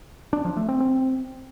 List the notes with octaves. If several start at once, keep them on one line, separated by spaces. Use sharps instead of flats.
D4
F3
A3
C4
C4